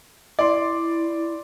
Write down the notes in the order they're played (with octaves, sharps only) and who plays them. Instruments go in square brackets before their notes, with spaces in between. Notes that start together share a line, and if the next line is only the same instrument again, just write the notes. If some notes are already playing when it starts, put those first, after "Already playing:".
[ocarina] E4 [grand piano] D5 C6